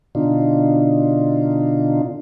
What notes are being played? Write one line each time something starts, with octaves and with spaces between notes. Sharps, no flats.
B2 D3 D4 D#4 F4